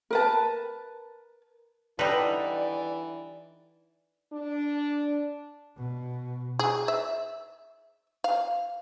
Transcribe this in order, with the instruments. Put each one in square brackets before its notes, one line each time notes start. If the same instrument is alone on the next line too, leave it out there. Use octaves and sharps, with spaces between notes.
[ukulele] A#4 B4 A5
[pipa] D3 G3 [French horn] E3 [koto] D#4 B4 [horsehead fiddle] D5
[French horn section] D4
[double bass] B2
[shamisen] G#4
E5
F5